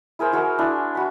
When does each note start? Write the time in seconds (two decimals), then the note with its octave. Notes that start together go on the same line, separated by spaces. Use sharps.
0.19 E4 G#4 A#4 C5
0.32 E4 F#4 G#4 A#4
0.59 D4 E4
0.95 F#4 B5